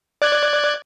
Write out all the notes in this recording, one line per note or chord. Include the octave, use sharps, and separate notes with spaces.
D5 F#6 G#6